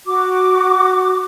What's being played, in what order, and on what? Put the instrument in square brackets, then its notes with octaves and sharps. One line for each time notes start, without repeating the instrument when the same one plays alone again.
[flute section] F#4 D6